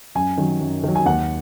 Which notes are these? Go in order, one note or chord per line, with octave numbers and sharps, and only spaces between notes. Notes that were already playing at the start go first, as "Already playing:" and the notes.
F#2 G#5
D#3 F#3
F#2
D#3 F#3
G#5
D#2 F#5